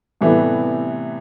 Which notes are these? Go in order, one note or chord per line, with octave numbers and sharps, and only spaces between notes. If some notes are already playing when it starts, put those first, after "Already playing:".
A2 C3 E3 G3 A3 B3